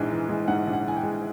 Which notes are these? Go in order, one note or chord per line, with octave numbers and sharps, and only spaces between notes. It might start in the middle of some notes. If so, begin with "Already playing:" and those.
Already playing: A#1 G#2 E3 G#3
E3
G#3
G#2 F#5
A#1
F#5
E3 G#5
G5
G#3